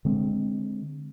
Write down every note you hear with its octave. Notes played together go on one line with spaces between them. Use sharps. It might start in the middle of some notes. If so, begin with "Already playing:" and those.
D3 G#3 C4